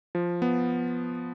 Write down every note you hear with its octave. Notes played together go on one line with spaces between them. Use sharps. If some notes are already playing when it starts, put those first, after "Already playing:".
F3
B3